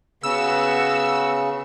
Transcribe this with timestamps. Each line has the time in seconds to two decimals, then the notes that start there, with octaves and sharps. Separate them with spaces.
0.23 C#3 B3 F#4 E6